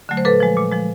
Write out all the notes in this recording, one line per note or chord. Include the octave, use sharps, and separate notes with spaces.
D3 F#3 A3
C5
A#2 A4 B4
F3 G#3
A#2
F3 G#3